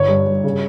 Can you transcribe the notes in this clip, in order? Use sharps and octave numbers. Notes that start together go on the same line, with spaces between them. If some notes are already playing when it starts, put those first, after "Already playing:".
Already playing: G1 C#5
G2
G2
C#3